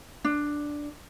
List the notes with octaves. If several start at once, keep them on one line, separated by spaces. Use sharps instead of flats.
D4